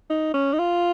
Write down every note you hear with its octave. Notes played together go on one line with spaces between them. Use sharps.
D#4
C#4
D#4
F4